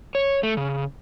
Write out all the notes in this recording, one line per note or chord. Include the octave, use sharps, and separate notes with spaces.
C#5
A3
C#3